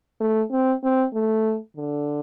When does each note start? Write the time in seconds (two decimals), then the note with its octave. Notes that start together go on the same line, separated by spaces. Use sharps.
0.21 A3
0.52 C4
0.84 C4
1.14 A3
1.77 D3